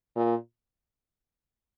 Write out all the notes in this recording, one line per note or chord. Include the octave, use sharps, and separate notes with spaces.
A#2